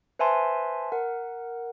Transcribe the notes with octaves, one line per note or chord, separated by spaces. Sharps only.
B4 C5 E5 G#5 A5 C6
A#4 F#5